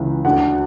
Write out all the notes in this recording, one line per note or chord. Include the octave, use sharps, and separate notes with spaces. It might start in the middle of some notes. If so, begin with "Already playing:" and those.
Already playing: C#2 C#3 E3
D2 D3 F#5